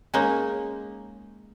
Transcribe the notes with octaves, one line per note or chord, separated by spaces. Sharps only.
G#3 A#3 C#4 D#4